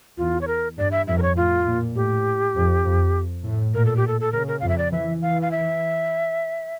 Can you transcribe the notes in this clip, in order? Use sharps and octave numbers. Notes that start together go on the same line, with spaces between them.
E2 F4
C#5
A#4
G2 D5
E5
F2 E5
A#4
C#5
A2 F4
A#2
A2 G4
F2
F2
A2
A#2 A#4
A4
G4
A4
A4
C#3 A#4
A#4
F2 F5
E5
D5
E3 E5
E3 F5
F5
E5